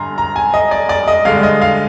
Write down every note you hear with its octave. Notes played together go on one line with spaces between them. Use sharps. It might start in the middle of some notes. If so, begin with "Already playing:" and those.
Already playing: G1 G2 D3 G#5 A#5 C6
A#5
G#5
D#5
D5
D5
D#5
G2 D3 G#3 F5
D#5
F5